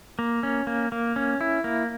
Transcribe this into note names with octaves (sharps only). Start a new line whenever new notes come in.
A#3
C#4
A#3
A#3
C#4
E4
A#3